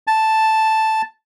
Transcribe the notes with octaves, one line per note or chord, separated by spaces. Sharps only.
A5